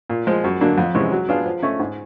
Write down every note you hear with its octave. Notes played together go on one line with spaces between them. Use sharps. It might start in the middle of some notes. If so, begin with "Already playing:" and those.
A#2
F3 G#3
F#2
D3 F#3 A#3 D4
F2
C3 E3 G#3 C#4
F#3
B3 D4 F4 G#4
F3
A3 C#4
G#2